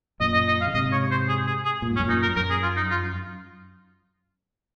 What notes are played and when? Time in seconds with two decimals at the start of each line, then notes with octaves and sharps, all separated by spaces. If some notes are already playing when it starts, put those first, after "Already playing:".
0.20 F#2 A#2 D#5
0.34 D#5
0.48 D#5
0.61 F5
0.67 C#3
0.74 G#2 C3 D#5
0.92 C#5
1.11 C5
1.28 G#4
1.47 G#4
1.65 G#4
1.82 A#2
1.91 G#2
1.96 C#4
2.00 F#2 A#2
2.09 D#4
2.22 A#4
2.36 F#2 A#4
2.50 G#4
2.63 F4
2.76 D#4
2.90 F4